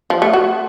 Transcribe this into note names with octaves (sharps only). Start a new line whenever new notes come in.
F3
A3
F#4